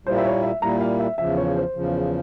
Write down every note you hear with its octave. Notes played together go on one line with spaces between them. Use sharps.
A#2 G3 A#3 E4 C5
E5
C#5
E5
A#2 G3 A#3 E4 A#5
F5
E5
E2 C#3 F3 E5
C#5
C5
E2 C#3 F3